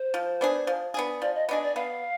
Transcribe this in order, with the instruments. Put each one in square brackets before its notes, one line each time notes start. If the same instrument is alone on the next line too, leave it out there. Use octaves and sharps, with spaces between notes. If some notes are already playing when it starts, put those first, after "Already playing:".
Already playing: [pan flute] C5
[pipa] F3
B3 D4 G#4
F3
B3 D4 G#4
[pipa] F3 [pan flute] D5
[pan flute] D#5
[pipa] B3 D4 G#4 [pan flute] D#5
[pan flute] D5
[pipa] B3 [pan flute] F5